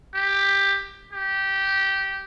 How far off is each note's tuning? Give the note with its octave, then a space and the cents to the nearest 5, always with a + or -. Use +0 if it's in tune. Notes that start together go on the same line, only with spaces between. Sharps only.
G4 +10
G4 -15